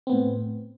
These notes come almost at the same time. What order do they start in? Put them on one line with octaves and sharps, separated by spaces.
C4 B3 A2